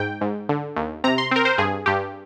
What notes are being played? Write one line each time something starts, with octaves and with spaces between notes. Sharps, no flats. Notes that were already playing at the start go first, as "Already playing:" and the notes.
Already playing: G#2 G5
G#2
D3
D#2
C3 A#5
C6
C4 A#4
C5
G2 G#4
G2 G4